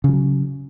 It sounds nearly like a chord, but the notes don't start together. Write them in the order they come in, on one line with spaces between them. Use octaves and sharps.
C#3 F3 F#3